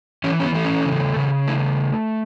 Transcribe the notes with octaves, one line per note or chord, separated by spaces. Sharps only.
E3 C#4
C#4
B3
A3
C#4
C#3
C#3
A3 E4